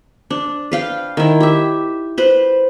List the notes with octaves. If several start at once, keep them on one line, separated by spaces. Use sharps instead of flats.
D4
B4 F5 G5
D#3 E4
G4 E5
B4 C5